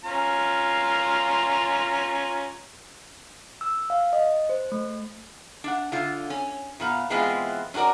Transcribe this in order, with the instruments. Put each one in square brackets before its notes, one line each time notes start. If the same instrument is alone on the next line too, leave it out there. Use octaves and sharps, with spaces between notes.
[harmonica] C#4 F4 A#5
[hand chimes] E6
F5
D#5
C5
A3
[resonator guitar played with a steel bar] D4 F#5
D3 F4
C#4
A#2 B3 F5
E3 G#3 B3 C4 F4
C#4 D4 F#4 A#4 D5